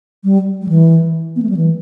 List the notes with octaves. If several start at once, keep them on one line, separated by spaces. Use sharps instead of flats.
G3
G3
E3
B3
A3
G3
E3